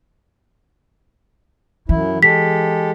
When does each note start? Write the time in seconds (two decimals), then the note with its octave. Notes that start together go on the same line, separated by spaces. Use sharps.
1.89 F#2 E3 E4
2.23 G#3 G4 A4 B6